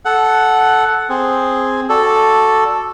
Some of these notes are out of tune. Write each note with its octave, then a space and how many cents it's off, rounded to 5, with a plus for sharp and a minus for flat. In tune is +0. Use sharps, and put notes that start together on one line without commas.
A4 -10 F#5 +5
C4 +0 G#4 +0
F#4 -5 A4 +0 D5 +0